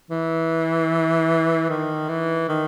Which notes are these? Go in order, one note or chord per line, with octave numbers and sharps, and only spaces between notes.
E3
D#3
E3
D#3